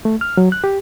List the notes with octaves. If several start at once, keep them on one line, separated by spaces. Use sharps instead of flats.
A3
F6
F#3
F#6
G4